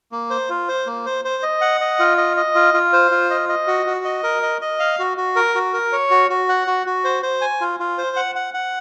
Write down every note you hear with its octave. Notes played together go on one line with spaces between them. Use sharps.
A#3
C5
F4
C5
A#3
C5
C5
D#5
F#5
D#5
F4
D#5
D#5
F4
F4
C5
F4
D#5
D#5
F#4
F#4
D#5
A#4
D#5
D#5
F5
F#4
F#4
A#4
F#4
A#4
C#5
F#4
F#4
F#5
F#4
F#4
C5
C5
G#5
F4
F4
C5
F#5
F#5
F#5